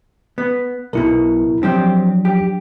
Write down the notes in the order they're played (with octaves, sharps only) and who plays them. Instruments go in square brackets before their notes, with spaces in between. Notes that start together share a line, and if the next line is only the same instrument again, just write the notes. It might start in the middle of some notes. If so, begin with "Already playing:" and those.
[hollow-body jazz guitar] B3
[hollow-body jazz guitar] B1 B2 [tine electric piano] B3 E4 A#4
[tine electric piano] F3 F#3 D4 [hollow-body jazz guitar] C4 G4
[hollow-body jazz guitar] G4